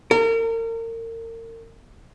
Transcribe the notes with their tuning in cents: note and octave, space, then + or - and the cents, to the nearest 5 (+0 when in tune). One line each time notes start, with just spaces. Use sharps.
A#4 -35